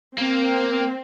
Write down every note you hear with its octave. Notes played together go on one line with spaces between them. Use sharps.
A#3 C4